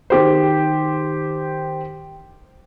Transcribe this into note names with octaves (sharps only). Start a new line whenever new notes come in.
D#3 G4 C5